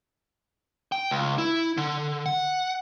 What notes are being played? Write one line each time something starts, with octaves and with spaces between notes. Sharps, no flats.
G5
C#2
E4
D3
F#5